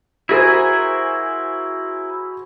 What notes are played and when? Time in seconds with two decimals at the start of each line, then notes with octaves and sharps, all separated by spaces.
0.29 E4 F#4 G#4 A#4 C5 G#5